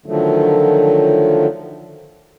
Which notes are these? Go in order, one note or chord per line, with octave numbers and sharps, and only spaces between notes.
D3 D#3 F3 F#3 A3